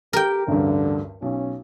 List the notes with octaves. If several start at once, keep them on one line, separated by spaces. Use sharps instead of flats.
G4 A#4 G5
A1 D2 G2 D3
B1 C#4